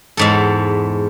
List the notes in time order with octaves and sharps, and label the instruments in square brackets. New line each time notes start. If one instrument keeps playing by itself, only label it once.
[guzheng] E2 G#2 A4